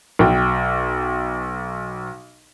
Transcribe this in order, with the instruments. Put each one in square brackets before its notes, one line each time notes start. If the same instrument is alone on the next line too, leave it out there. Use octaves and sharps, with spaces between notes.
[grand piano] B1 G5